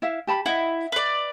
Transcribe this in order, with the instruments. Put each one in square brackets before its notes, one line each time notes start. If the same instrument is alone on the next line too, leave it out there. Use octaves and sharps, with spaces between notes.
[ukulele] E4 E5 F5
G4 A5 B5
[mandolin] E4 [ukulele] D#5 F#5
[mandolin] B4 D5